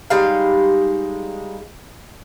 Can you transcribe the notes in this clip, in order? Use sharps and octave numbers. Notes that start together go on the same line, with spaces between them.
G3 G#3 D#4 F5